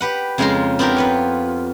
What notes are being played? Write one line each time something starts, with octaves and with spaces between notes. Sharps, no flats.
G4 B4 F#5
F2 C#3 G#3 F4 A#5 C6
B3 C4 D4 G4 A#4
F4 B4 C#5